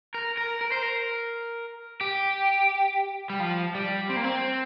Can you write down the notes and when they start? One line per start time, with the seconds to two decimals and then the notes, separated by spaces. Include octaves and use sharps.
0.14 A#4
0.37 A#4
0.61 A#4
0.72 C5
0.83 A#4
2.01 G4
3.30 G3
3.40 F3
3.75 G3
4.10 C4
4.16 A#3
4.24 C4